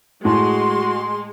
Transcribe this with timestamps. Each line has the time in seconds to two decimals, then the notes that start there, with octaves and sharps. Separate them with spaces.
0.25 A2 G#3 F#4 C6